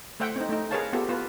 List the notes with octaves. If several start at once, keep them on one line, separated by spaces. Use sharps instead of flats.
A3 C5 E5 F#5 G5
C4 D#4
A3 D#4
G#4 A#4 B4 C#5 F5 A5
B3 F4 G4 A4
B3 F4 B4